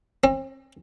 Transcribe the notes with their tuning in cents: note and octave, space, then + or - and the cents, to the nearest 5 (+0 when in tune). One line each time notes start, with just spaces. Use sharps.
C4 +40